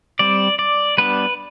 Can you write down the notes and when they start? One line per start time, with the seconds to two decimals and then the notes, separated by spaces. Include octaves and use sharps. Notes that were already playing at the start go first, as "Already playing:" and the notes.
0.19 G3 C4 D5
0.59 D5
0.98 G3 B3 D4 B4